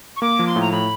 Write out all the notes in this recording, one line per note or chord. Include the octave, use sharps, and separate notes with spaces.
C#6
A#3 D6
F3
C6
A2
A#5
A2 B5